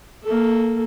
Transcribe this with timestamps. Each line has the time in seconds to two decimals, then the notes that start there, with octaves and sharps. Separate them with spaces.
0.23 A#3 A4